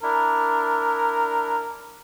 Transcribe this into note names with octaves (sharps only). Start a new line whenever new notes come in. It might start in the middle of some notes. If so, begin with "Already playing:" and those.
D4 E4 A#4